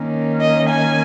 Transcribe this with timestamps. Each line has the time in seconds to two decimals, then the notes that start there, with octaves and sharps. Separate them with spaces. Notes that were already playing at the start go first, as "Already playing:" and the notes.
Already playing: D#3 A#3 C#4
0.41 D#5
0.70 G#5